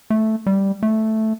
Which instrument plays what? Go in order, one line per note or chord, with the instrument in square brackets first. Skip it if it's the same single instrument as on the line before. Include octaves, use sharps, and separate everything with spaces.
[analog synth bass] A3
G3
A3